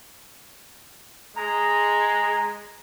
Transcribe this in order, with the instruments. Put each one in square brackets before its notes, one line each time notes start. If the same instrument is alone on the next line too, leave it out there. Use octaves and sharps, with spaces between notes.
[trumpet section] G#3 [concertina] A#5